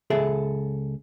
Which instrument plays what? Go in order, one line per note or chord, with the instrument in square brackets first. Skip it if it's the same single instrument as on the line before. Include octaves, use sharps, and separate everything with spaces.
[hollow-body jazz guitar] C#2 G#4 A4 E5